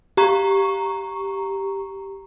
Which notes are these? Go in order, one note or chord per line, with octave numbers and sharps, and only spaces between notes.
G4 A#5 C#6